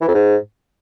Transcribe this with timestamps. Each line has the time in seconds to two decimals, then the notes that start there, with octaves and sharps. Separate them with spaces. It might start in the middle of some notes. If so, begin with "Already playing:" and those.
0.01 E3
0.08 F2
0.14 G#2